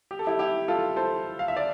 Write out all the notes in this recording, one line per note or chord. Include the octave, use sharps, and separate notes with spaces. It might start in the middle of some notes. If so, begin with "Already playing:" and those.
G4
A4
E4 G4
E4 G4
F4 A4
A4 C5
F5
E5
D5